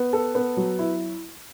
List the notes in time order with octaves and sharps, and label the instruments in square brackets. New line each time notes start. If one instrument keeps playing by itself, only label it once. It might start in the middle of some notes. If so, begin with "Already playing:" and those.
Already playing: [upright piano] B3
A4
B3
F#3
E4